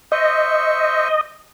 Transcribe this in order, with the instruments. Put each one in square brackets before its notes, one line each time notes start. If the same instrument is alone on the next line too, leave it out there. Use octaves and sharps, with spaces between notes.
[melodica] C5 E5 C#6 [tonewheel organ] D#5